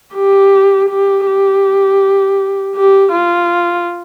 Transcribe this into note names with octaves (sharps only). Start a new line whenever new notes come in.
G4
G4
G4
G4
F4